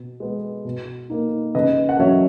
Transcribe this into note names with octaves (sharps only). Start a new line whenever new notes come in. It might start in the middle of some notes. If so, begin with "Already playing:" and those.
Already playing: B2
G#3 B3
B2
A#3 D#4
C#3 B4 D#5
F#5
F#3 C#4 C#5 E5